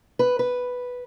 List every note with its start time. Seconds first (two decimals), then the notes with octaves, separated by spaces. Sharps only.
0.19 B4
0.39 B4